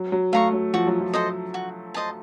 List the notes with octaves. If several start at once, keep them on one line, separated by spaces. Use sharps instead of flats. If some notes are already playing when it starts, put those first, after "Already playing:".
Already playing: F#3
F#3
A3 F5 A#5 C#6
F#3
F3 F#4
F#3
F3
A4 C5 D#5
F#4
C5 D#5 A5